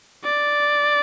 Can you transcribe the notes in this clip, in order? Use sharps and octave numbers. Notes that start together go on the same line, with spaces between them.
D5